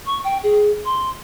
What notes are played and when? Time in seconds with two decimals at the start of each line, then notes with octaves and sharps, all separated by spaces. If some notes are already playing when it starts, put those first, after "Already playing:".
0.06 C#6
0.24 G5
0.43 G#4
0.85 C6